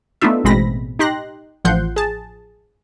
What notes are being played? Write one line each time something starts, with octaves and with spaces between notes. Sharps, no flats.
A3 B3 D4 D#4 F4 E5
A1 B2 G#3 C4 B5 A#6
D#4 G4 C6 F#6 A#6
A1 F3 F#5 C6 G6
G#4 A5